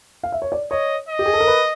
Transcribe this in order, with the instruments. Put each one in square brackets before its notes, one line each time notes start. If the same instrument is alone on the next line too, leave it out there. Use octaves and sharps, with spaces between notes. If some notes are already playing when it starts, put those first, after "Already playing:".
[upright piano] F5
E5
C#5
D5
[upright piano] C#5 [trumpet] D#5
[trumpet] D#5
[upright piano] G4
G#4
A4
A#4
B4